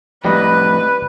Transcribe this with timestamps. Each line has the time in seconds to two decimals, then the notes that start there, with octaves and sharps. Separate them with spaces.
0.25 F2 A2 G3 B4 D#5